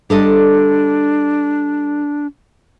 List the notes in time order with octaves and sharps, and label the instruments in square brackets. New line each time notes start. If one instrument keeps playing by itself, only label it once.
[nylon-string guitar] G3 A4 D#5 [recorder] D4